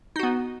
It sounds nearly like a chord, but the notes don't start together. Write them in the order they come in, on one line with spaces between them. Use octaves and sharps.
D#4 F#4 B3